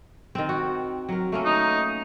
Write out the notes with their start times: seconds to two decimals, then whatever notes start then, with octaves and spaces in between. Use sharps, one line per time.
0.35 D#3 C4
0.49 F#4
1.09 F#3 A#4
1.32 A3 A#3 C#4
1.45 D#4